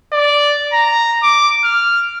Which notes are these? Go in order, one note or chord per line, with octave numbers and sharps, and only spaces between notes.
D5
A#5
D6
F6